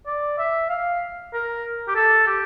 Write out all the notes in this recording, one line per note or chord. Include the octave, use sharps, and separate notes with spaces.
D5
E5
F5
A#4
G4
A4
G4